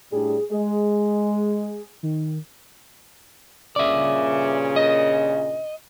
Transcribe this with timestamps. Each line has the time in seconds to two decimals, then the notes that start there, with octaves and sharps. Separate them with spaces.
0.12 A2 G3 D4 G#4
0.51 G#3 G#4
2.03 D#3
3.76 G2 A#2 C#3 D5 E5
4.76 D#5